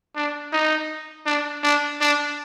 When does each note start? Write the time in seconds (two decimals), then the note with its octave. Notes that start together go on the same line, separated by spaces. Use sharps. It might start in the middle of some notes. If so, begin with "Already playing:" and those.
0.16 D4
0.53 D#4
1.26 D4
1.63 D4
2.01 D4